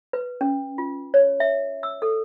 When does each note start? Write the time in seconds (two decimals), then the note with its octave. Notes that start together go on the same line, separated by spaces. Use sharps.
0.13 B4
0.41 C#4
0.78 F4
1.14 C#5
1.40 E5
1.83 E6
2.02 A4